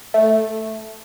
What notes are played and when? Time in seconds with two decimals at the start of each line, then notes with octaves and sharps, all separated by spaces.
0.14 A3